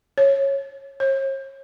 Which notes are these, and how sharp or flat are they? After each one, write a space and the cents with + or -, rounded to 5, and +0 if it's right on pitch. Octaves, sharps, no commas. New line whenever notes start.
C#5 -15
C#5 -45